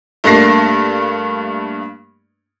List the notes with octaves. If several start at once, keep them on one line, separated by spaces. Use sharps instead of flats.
G2 A3 A#3 D4 A#6 C7